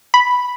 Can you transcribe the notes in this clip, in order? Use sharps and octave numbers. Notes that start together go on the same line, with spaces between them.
B5